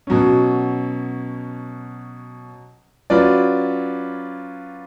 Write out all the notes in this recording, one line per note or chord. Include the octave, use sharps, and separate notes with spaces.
B2 F#3 C#4
F#3 C#4 F4 B4 D5